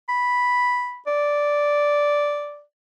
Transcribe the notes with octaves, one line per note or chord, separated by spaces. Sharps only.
B5
D5